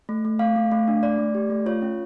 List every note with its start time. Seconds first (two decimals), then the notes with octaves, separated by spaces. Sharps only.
0.09 A3
0.25 A3
0.39 A3 F5
0.56 A3
0.72 A3
0.88 D4
1.03 A3 D5
1.18 A3
1.35 G4
1.50 A3
1.66 F4 C#5
1.82 C#4